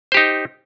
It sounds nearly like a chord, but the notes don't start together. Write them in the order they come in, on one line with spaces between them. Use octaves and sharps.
C5 G4 D#4